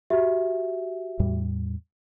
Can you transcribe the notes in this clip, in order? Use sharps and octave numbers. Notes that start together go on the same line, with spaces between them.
F#4 G4 E5
E2 A2 G3